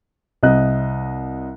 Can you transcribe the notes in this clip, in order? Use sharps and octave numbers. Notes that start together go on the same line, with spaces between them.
C2 D#5 F#6